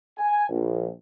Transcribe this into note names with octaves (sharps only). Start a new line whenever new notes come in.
G#5
A#1